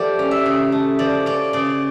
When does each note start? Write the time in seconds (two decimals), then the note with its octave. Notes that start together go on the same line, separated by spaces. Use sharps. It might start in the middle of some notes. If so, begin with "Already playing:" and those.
Already playing: F3 A3 G4 A4 D5
0.19 C#4
0.31 E5
0.46 C#3
0.72 A3
0.99 F3 D5
1.26 C#4 D5
1.53 C#3 D5